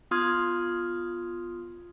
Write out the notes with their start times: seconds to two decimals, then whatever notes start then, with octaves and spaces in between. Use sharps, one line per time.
0.11 B3 F4 C6 D#6 F6 G#6